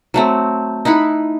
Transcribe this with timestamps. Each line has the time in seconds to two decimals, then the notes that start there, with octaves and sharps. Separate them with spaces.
0.14 F#3 A3 C4
0.85 D#4 E4 F#5 B5